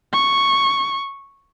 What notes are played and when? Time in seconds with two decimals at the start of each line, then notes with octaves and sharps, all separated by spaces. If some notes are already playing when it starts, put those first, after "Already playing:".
0.13 C#6